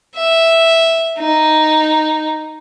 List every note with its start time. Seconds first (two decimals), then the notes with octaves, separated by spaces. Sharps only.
0.16 E5
1.18 D#4